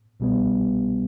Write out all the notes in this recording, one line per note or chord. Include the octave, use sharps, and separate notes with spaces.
C2 B2 G3 B3